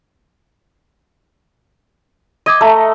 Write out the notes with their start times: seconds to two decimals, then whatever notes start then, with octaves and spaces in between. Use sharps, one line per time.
2.46 D#5 D6 G#6 D#7
2.61 A3 E5 A5 A#5